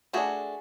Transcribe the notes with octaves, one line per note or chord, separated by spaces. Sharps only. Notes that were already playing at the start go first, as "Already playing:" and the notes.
A3 D4 F#4 G#4